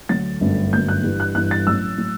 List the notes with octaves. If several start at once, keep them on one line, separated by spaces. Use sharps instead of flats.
D2 D3 F#3 A3 A6
G1 F#2 D3 A3
G1 F#2 D3 A3 G6
F#6
G1 G2 E3
F#6
G1 G2 E3 F#6
A6
A1 A2 F#3 E6
A2 F#3